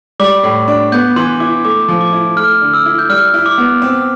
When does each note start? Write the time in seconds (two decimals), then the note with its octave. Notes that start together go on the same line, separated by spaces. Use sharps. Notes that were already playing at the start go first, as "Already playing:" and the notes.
0.20 G3 D6
0.43 A2
0.68 D4
0.92 B3 G6
1.16 E3 C6
1.40 E4 D6
1.65 A3 D6
1.88 F3
2.01 D6
2.13 E4
2.37 A3 F6
2.62 D3
2.73 E6
2.86 E4
2.99 G6
3.09 G3 F6
3.34 E4
3.46 D6
3.58 B3
3.82 C4